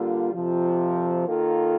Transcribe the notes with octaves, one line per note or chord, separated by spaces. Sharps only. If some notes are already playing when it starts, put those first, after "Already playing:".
Already playing: D3 G3 A#3 F4 A4
F2 C3 F3
D#3 A#3 F4 A4